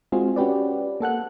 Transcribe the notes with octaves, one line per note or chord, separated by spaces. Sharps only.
G#3 C4 F4 F#4 G#4
C#4 F#4 G4 B4 D5
A#3 A4 F#5 F#6